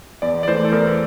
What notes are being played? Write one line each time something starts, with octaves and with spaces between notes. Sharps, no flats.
E2 D5
D5
E3 A3 E4 C5
A4
E2 A#4